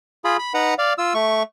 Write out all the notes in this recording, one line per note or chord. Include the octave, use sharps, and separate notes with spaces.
F4 G#4 B5
B5
D#4 B4 F#5 A#5
D5 F5
F4 E6
A3 C#6